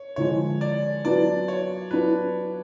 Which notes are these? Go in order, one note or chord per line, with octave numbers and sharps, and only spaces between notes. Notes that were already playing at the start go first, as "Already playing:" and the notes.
Already playing: C#5
D3 F3 G#3 C#5
D5
F#3 B3 D4 F4 D5
C#5
F#3 B3 D4 F4 B4